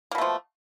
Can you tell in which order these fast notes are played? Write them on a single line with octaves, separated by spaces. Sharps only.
A#3 B2 A3 F3